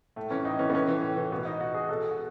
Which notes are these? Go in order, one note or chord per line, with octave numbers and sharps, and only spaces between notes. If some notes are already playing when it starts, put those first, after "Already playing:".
A2 A3
E3 C#4
A2 D#4
E3 C#4
B3
A2 C#4
E3
A2
E3
B2 B3
D#4
B2 F#4
G#4
B2 A4
G#4
F#4